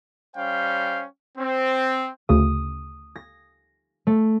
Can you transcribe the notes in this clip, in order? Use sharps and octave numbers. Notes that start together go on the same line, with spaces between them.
G3 C#4 C5 F5 G5
C4
D2 C#3 D#6
A#6
A3